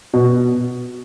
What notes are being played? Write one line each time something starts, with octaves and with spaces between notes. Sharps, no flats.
B2